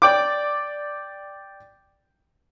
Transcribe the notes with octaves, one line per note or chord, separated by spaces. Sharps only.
D5 G5 D6